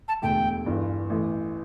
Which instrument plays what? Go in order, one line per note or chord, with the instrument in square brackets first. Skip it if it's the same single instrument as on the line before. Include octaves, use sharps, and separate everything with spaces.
[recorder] A5
[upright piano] E1 D2 D3 A3 [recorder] G5
[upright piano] G1 G2 E3
A1 A2 E3